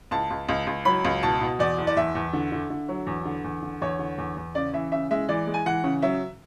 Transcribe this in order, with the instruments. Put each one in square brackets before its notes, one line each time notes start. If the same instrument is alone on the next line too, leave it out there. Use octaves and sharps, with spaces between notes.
[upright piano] C#2 A5
C#2
C#2
C#2
F#3 B5
C#2
B2 A5
B2
E2 D5
F#1
D5
E2 E5
E2
D3
D3
D3
F#3
E2
D3
E2
D3
E2 C#5
D3
E2
E2
C#3 D5
E3 E5
C#3 E5
G#3 E5
E3 D5
G#3
G#5
E3 F#5
C#3
F#3 E5